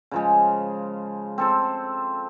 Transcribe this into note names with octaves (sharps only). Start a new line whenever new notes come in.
C#3 F3 G#3
C4 A4 C5